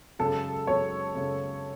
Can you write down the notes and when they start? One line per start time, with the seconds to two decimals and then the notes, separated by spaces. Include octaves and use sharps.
0.19 F#2 C#3 G#3 A4
0.67 F#2 C#3 G#3 C#5
1.15 F#2 C#3 G#3